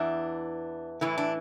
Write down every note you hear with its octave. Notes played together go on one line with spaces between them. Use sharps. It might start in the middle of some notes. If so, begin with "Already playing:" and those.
Already playing: E2 E3 D4
A2 E3 E4
D4